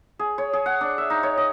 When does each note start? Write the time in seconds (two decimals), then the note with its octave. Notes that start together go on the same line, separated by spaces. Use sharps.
0.19 G#4
0.38 C#5
0.53 G#4
0.66 F#5
0.81 D4
0.98 E5
1.10 D#4
1.23 C#5
1.38 D#5